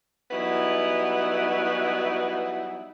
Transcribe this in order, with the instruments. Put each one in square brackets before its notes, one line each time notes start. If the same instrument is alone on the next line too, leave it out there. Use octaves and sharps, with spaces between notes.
[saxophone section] E3 F#3 G3 B3 D#4 E4